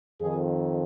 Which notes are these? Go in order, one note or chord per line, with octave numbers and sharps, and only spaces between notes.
F2 D#3 G#4